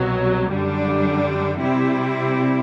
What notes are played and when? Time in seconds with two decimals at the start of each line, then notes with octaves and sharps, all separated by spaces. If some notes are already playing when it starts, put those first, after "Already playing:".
Already playing: C2 B2 F#3
0.52 F#2 D3 G3 D4
1.62 C3 G3 C4 E4